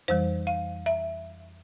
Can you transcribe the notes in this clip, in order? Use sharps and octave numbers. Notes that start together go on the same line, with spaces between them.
F2 E3 G3 C5
F5
E5